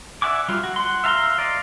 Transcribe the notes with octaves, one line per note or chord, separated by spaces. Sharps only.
D5 E5 F#5 G#5 D6
F#3 G3 F4
F#4
F#5 C6
E5 F5 A5 A#5 C6
D5 D#5 F5